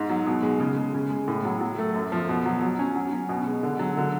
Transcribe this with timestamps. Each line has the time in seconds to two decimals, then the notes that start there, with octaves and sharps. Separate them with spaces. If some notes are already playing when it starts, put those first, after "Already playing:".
Already playing: G#2
0.09 F#3
0.26 B2
0.43 G#3
0.60 C#3
0.77 G#3
0.94 C#3
1.10 G#3
1.28 A2
1.45 F#3
1.61 F#3
1.78 A3
1.95 F#2
2.12 F3
2.29 B2
2.46 F#3
2.62 F#3
2.79 C#4
2.95 F#3
3.13 C#4
3.29 B2
3.47 G#3
3.63 D3
3.79 F#3
3.97 D3